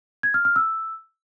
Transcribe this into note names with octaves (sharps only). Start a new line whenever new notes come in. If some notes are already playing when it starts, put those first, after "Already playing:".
G#6
F6
F6
E6